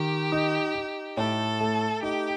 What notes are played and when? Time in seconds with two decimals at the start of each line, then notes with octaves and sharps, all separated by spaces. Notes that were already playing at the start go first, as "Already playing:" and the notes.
Already playing: D#3 G4
0.32 D#4
0.75 D#4
1.17 A2 A4
1.60 A3
2.03 D#4 G4